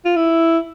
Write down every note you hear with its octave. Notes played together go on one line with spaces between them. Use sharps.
F4
E4